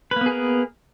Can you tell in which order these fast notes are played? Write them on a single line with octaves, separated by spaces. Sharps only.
B4 A#3 B3 G#4 A#4